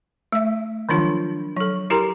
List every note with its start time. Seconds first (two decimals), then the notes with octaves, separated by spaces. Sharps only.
0.32 A3 E5
0.89 D#3 F3 F#3 D4 F4
1.56 F#3 A4
1.90 E4 G4 A#4 A#5 C6